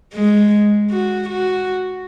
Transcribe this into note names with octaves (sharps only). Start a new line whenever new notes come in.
G#3
F#4
F#4